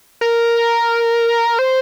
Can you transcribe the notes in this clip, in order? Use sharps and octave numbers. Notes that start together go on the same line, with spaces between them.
A#4
C5